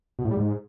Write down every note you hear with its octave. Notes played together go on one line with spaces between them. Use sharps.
B2
A2
G3
G#2